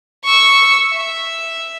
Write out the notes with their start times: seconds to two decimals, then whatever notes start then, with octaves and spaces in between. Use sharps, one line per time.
0.24 C#6 E6
0.91 E5